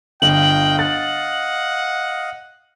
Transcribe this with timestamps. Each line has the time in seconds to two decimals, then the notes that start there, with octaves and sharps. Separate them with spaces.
0.22 G1 D#5 F5 G5 F#7
0.79 F#5 A6